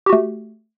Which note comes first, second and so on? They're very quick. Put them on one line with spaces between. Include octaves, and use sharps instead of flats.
G4 F#4 A3